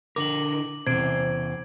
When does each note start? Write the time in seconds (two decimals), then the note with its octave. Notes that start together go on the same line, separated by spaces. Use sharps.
0.16 D3 A#4 D6 F#7
0.87 E2 C3 C5 G#6 D7